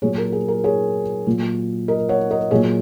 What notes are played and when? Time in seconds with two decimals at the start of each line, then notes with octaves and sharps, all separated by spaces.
0.02 A#2 F#3 G#4 C#5
0.18 A#4
0.32 G#4
0.48 A#4
0.64 G#4 C#5
1.27 A#2 F#3
1.88 A#4 D#5
2.09 C#5 F#5
2.31 A#4 D#5
2.51 A#2 F#3 G#4 C#5